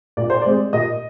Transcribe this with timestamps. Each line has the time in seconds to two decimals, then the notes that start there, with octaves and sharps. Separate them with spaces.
0.17 A#2 D5
0.30 C5
0.42 G#3 C4 D5
0.73 A#2 D#5